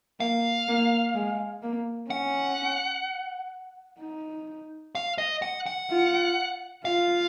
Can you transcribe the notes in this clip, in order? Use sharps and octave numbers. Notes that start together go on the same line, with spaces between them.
A#3 F5
A#3
G#3
A#3
C#4 F#5
D#4
F5
D#5
F#5
F#5
F4
F4 F5